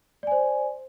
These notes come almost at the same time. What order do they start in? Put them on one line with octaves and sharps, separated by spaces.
D5 G#5 C5